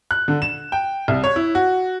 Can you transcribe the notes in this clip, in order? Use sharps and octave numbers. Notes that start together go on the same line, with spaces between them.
F#6
D3
E7
G5
C2
C#5
E4
F#4